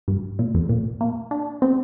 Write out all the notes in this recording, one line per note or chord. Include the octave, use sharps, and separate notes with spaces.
G2
A#2
F2
A#2
A#3
D4
C4